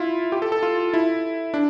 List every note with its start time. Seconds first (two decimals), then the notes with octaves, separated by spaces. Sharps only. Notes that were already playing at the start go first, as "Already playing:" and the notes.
Already playing: E4 F4
0.32 G4
0.42 A4
0.52 A4
0.63 F4
0.94 E4
1.54 D4